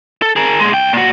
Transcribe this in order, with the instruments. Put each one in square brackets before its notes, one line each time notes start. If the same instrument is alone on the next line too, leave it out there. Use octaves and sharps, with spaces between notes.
[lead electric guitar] A4
G#4 A#4
A#2 G#3
C2 G5
A#2 F#4